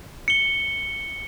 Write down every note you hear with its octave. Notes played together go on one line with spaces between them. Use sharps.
C#7 G7